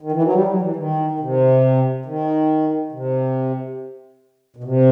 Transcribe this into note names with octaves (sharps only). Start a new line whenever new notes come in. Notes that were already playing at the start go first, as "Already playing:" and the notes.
D#3
E3
F#3
G3
F#3
E3
D#3
D#3
C3
D#3
C3
B2
C3